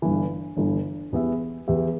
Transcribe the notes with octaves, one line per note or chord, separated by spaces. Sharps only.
G1 G2 E3
G1 G2 E3
E2 E3 B3 G4 E5
E2 E3 B3 G4 E5